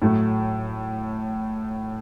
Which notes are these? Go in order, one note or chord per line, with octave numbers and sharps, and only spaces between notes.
A2 F#3 A3